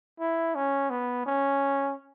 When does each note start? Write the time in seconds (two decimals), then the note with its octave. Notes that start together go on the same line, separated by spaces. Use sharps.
0.19 E4
0.55 C#4
0.90 B3
1.26 C#4